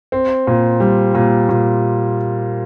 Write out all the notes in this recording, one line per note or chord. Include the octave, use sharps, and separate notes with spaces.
C4
A#2
G3
A#2
A#2